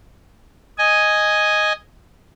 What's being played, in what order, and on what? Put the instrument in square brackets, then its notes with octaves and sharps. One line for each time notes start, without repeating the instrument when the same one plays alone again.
[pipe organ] D#5 G#5